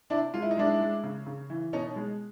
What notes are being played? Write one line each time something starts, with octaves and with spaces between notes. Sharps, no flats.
C3 D4 E4
G#3 F4
E4
D#4
G#3 D4 E4
G#3
C#3
C#3
E3
B2 C#4 D#4
G#3